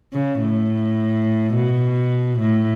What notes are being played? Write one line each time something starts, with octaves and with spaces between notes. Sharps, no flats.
C#3
A2
B2
A2